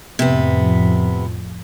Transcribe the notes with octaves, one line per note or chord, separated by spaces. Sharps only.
F2 A2 C3 F3 B3